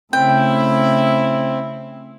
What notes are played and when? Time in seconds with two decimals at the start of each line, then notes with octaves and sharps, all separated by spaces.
0.13 C#3 A3 C4 E4 G5